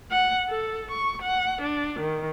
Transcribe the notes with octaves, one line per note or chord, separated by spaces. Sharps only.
F#5
A4
C#6
F#5
D4
D#3